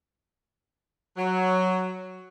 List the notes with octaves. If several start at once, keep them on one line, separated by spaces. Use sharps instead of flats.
F#3